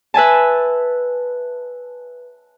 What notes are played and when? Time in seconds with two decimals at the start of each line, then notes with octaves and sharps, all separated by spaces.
0.14 B4 E5 G#5 A5